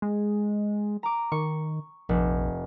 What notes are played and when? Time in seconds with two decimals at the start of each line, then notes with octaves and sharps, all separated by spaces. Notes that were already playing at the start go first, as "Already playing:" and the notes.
0.02 G#3
1.03 A#5 D6
1.32 D#3 C#6
2.09 F1 A#1